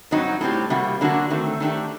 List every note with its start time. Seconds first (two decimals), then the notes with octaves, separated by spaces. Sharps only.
0.11 G2 F#3 C4 D#4 F#4
0.41 A2 G3 C4 G4
0.70 C3 G3 A#3 F#4
1.01 D3 F#3 A#3 D4 F#4
1.30 D#3 A3 C4
1.60 D#3 A3 D4 G4